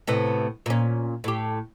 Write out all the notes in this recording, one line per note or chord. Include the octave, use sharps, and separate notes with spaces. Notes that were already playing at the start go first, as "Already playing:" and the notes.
A2 C3 B3
A#2 C#4
A2 G4